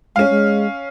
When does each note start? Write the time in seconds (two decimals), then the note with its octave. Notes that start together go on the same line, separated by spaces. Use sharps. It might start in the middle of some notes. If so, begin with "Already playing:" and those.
0.16 G#3 C#4 F5
0.30 G#3